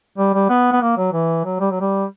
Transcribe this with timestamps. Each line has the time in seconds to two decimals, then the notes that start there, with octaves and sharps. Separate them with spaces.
0.18 G3
0.34 G3
0.50 B3
0.72 B3
0.82 A#3
0.97 F#3
1.13 E3
1.45 F#3
1.60 G3
1.71 F#3
1.80 G3